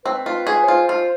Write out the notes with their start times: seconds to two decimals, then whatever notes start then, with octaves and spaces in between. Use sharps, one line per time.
0.05 C4 B4
0.26 F4
0.47 G#4
0.64 C#5
0.67 F4 C5
0.89 F4